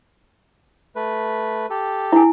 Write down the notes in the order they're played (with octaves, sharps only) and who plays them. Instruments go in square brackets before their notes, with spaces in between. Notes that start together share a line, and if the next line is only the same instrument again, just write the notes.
[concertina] A3 B4
G4 A4
[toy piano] E4 G#5